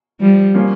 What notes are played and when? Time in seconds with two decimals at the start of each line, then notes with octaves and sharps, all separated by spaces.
0.21 F3 G3
0.54 F3 A#3 C#4 F4